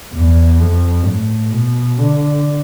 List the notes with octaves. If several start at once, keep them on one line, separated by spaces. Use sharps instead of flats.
E2
F2
A2
B2
D3